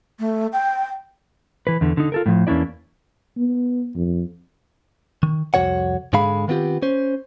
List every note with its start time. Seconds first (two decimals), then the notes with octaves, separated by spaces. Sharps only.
0.20 A3
0.53 G5
1.67 E3 B4
1.81 E2 D3
1.97 D3 D#4
2.12 F4 A4 A#4
2.26 A2 F3
2.47 E2 A#3 C#4 D4 E4 D5
3.37 B3
3.95 F2
5.23 D#3
5.54 C2 F2 D#3 F#4 C#5 F#5
6.13 G#2 D3 G#3 G#4 F5 B5
6.48 D#3 B3 C4 F4 G4
6.82 C#4 C5